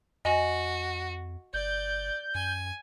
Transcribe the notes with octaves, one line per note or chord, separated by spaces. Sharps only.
F2 F#4 D#5 G#5
G1 D5 G6
F#2 G#5